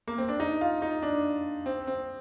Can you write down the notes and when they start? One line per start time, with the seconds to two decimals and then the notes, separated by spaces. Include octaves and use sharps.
0.07 A#3
0.18 C4
0.28 D4
0.40 D#4
0.61 F4
0.82 D#4
1.02 D4
1.66 C4
1.87 C4